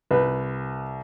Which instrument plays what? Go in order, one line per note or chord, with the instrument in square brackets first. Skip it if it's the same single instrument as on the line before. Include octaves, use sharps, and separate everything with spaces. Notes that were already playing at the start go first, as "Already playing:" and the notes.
[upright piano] C2 [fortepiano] B4